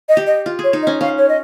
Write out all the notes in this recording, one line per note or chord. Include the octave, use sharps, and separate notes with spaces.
D#5
G4
D#5
F4
G#4 C#5
D#4
D#5
C#4
C#4 F5
C#5
D#5